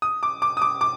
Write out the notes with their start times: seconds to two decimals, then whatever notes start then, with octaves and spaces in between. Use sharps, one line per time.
0.02 D#6
0.23 D6
0.42 D6
0.57 D#6
0.62 D6
0.81 D6